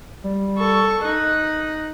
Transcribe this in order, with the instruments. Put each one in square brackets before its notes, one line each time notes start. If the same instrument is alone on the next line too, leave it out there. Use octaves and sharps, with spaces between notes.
[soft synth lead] G3
[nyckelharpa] A4 C#6
[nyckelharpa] D#4 [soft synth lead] F#6